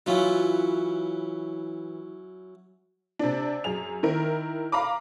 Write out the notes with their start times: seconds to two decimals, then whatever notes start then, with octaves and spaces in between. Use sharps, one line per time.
0.06 E3 F#3 C#4 E4 F4
3.19 C3 D4
3.64 F#2 G#4 F7
4.03 D#3 E4 A#4
4.72 F5 A#5 B5 D6